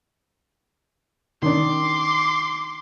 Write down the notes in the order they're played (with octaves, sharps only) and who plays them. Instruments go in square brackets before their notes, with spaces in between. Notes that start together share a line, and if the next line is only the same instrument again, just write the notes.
[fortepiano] D#3 D4 [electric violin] C6 D6